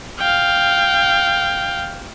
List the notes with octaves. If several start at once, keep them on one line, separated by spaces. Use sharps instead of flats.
F5 G5